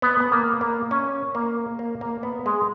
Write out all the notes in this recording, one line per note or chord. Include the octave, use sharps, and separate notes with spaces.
B3
B3
A#3
A#3
C#4
A#3
A#3
A#3
B3
G#3